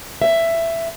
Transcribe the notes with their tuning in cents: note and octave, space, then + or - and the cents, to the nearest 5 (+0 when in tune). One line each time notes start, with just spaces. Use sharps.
E5 +10